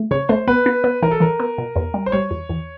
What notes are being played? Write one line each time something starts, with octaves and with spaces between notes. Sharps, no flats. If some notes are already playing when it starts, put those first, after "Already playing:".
Already playing: A3
C#3 C#5
A3 C5
B3 B4
B3
B3
E3 A#4
A4
E3 A#4
B3
B2
E2
G3
C5
G3 C#5
E2
E2